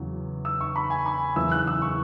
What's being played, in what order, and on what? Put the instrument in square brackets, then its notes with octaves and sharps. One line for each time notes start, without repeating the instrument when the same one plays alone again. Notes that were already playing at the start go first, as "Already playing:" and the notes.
Already playing: [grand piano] E2 C#3 F#3
E6
C#6
B5
G#5
B5
F#1 E2 C#3 E3 E6
F#6
E6
C#6